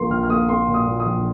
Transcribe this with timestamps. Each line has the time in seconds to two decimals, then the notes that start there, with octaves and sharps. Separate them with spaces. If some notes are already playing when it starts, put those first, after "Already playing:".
Already playing: A#1 A#3 C6
0.10 A#1 F6
0.23 F6
0.29 A#3 D#6
0.49 A#3 C6
0.68 A#2
0.74 D#6
0.87 A#2
1.00 D#6
1.06 A#1